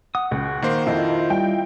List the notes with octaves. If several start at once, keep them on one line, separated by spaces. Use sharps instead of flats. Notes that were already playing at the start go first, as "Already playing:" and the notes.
F#5 D#6
C#2 F#4
D#3 A#3 C5
F2 E4 F4 D#5
G3 G5